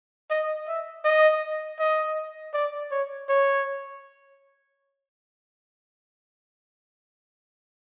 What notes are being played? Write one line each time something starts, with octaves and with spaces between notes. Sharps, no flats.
D#5
E5
D#5
D#5
D5
C#5
C#5